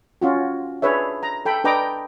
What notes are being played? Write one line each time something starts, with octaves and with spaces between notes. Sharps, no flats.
C#4 F4 F#4
D4 G#4 B4 C#5 E5
A#5
A4 G5 B5
D4 B4 D#5 G5 A#5 D6